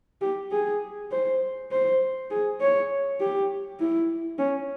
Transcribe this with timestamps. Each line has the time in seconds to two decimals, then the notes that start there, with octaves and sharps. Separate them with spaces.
0.22 G4
0.52 G#4
1.12 C5
1.71 C5
2.31 G#4
2.61 C#5
3.20 G4
3.80 E4
4.38 C#4